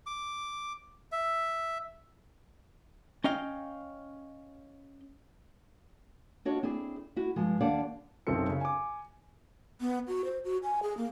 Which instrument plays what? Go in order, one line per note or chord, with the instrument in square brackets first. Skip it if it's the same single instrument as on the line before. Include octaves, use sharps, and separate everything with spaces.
[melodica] D6
E5
[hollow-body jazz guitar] C#4 D#5 F5 G5
[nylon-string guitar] D4 F4 F#4 C#5 D#5
C4 D4 E4 G#4
E4 F#4
G2 F3 G#3
D#2 D4 C5 D5 F5 F#5
[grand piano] B1 F#2 C4 A4 C#7
C#3
G#5 D6
[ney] B3
F#4
C5
F#4
G#5
G#4
A#3